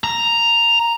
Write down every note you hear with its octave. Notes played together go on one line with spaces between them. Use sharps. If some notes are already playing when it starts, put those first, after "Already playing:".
A#5